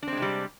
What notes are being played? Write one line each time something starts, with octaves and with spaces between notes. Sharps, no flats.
C3 G3 G#3 C4 D4